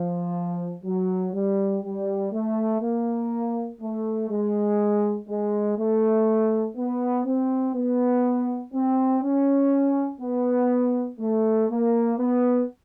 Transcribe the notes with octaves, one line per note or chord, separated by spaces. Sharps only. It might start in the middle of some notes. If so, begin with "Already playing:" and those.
Already playing: F3
F#3
G3
G3
A3
A#3
A3
G#3
G#3
A3
B3
C4
B3
C4
C#4
B3
A3
A#3
B3